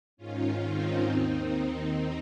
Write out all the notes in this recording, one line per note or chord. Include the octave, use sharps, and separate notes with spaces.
G#2 D#3 C#4 F4
C4 D#4
D#2 D#3